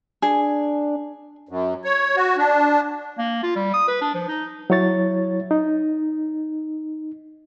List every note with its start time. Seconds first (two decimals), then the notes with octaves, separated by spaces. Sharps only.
0.22 D4 G#4
1.49 F#2
1.84 C#5
2.16 F#4
2.37 D4
3.18 A#3
3.43 F4
3.56 G3
3.74 D#6
3.88 B4
4.01 D4
4.14 F3
4.29 D#4
4.70 F#3 E4 C#5 A6
5.51 D#4